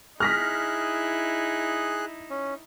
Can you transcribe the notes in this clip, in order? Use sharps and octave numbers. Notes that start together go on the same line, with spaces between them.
D#4 E4 G#4 F6 F#6 A#6 B6
C#4